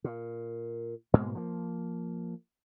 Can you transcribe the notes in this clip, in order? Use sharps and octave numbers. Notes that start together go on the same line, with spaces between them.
A#2
G#2 B2 G#3 A#3
F3 A#3